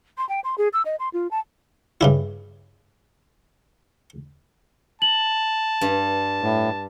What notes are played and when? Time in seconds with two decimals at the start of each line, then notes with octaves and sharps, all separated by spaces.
0.18 C6
0.29 G5
0.44 C6
0.58 G#4
0.73 E6
0.85 D#5
0.99 C6
1.13 F4
1.31 A5
2.01 G2 C#3 E4
5.02 A5 F#7
5.81 G2
6.42 A2